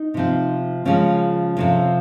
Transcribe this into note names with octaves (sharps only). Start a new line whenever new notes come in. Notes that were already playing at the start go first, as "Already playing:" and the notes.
Already playing: D#4
C3 F3 C4
C#3 F3 G#3 C#4
F2 C3 F3